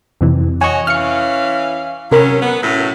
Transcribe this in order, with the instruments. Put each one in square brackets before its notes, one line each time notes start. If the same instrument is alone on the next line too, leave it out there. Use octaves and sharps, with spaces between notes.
[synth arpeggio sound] F2 C3 E3
[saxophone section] F#4 C#5 D#5 [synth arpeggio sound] G#5 C#6
[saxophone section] E3 C#4 F5 [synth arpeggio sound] F6 C#7
[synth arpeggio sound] C3 A#4 B5 [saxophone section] F#3 C#4
[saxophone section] B3
A2 F#3 C#4